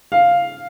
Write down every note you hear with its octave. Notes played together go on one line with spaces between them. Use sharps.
F5